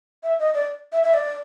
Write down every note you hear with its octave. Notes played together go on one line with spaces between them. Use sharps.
E5
D#5
D5
E5
E5
D5